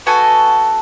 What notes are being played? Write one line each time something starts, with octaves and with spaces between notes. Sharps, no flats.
B3 F#4 A4 G#5